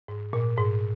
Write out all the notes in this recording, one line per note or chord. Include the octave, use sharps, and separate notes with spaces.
G#2
A#2
G#2